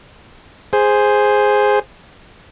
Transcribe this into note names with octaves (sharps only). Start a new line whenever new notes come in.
G#4 C5